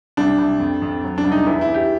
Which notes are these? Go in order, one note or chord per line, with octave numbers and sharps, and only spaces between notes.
C2 D4
C2
F2
F2
F#3
D4
C2
D#4
E2 E4
E4
E2
G4